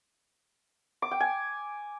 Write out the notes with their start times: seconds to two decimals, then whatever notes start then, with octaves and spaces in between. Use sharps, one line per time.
1.02 D6
1.11 G5
1.20 G#5